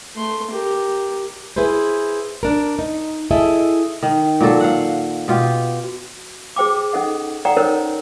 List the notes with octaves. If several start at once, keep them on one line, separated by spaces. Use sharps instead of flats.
A3 C6
G4 A#4
E4 G#4 B4 C5
D4 A#4
D#4
E4 G#4 A4 D#5 E5
D#3
A#2 F#3 A4
F5 F#5
B2 F4 G4
F#4
G#4 C5 G5 D6
C#4 D#4 A4 D#5 F#5
A4 D5 F#5 G5 A#5
C#4 D#4 A#4 C5 C#5